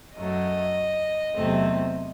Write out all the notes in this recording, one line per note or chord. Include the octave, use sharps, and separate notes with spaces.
F#2 F#3 A3 D#5
E2 C3 F#3 A3 C4